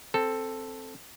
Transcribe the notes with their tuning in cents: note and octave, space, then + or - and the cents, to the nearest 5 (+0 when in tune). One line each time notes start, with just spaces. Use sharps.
C4 +0 A4 +0